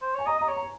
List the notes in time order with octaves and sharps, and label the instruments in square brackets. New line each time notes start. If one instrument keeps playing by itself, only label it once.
[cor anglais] C5
[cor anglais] C#5 [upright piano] G#5
[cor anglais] D#5 [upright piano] A#5
[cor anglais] D#5 [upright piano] A#5
[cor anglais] C#5
[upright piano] A#5